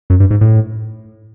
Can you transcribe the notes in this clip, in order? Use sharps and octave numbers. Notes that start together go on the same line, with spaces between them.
F#2
G2
G#2
A2